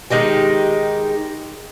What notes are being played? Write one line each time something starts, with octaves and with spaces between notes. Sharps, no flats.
D#3 G#3 D#4 G4